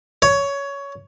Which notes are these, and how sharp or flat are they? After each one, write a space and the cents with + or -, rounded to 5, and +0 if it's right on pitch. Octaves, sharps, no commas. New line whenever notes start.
C#5 +15